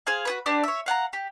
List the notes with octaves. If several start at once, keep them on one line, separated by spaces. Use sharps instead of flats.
G#4 C5 F5 G#5
F#4 G#4 B4
D4 G4 B4 D5
C#5 E5
F5 F#5 A5 A#5
G4